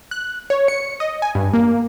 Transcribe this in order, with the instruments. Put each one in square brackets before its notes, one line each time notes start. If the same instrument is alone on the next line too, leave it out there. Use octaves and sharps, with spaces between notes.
[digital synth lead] F#6
C#5
C#7
D#5
G#5
G2
A#3